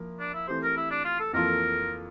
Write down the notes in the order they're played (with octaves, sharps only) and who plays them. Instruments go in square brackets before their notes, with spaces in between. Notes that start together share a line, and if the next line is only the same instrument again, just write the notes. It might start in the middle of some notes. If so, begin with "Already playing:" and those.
Already playing: [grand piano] F3 A#3 E4 A#4
[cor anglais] D4
E4
[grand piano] E3 A3 C4 G4 [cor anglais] C5
[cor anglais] A#4
E4
D4
F4
A4
[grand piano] F2 E3 A#3 F4 A4 [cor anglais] A#4